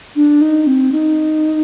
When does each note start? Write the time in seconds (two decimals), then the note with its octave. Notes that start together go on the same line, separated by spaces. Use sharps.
0.16 D4
0.41 D#4
0.67 C4
0.92 D#4